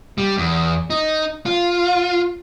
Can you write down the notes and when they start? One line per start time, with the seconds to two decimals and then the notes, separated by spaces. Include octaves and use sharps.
0.18 G3
0.38 E2
0.90 D#4
1.46 F4